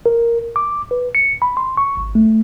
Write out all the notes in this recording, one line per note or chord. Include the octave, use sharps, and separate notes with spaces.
A#4
D6
B4
C#7
B5
C6
C#6
G#1
A3